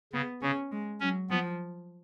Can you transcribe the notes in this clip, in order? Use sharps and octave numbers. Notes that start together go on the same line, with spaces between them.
C#3 B3
C#3 C#4
G#3
F#3 C#4
F3 B3